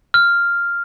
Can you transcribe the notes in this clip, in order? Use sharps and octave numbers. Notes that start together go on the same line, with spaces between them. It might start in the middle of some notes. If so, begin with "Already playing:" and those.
F6